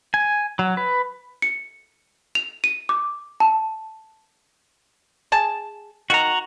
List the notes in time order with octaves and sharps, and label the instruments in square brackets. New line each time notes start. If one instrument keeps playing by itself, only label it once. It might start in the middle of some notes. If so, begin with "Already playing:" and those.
[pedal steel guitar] G#5
F#3
B4
[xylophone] C#7
F7
D#7
D6
A5
[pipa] G#4 A5
[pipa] D#3 [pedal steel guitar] F#4 F#5 A#5